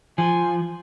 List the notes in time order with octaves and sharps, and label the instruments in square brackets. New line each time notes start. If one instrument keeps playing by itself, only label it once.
[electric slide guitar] F3 [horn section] G#5